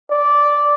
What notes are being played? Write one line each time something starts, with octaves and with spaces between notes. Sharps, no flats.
D5